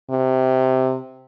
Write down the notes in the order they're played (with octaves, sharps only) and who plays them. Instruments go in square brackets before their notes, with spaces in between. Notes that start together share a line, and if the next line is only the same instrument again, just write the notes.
[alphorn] C3